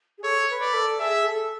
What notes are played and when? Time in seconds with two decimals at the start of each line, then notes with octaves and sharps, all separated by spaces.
0.18 G#4
0.24 A4 C#5
0.50 B4
0.61 D5
0.74 A4
1.00 G#4 E5
1.24 A4